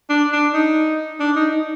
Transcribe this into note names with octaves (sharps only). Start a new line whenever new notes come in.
D4
D4
D#4
D4
D#4
D#4